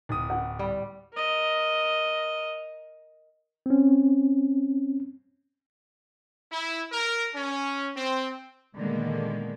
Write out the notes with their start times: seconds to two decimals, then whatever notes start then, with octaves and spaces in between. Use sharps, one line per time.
0.09 D1 D#6
0.30 F#5
0.59 G3
1.14 A#4 D#5
3.66 C4 C#4
6.52 E4
6.92 A#4
7.35 C#4
7.96 C4
8.76 A#2 D3 D#3 G#3 A#3 B3